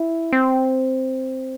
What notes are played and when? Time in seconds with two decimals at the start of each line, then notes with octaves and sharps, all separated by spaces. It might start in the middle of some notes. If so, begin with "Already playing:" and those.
Already playing: E4
0.33 C4